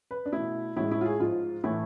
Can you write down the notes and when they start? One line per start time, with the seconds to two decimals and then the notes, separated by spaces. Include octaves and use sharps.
0.11 B4
0.26 D4
0.32 B2 A3 E4
0.76 A2 G#3 E4
0.91 E4
1.01 F4
1.06 G#4
1.20 G#2 F3 G#3 F4
1.64 A2 E3 A3 E4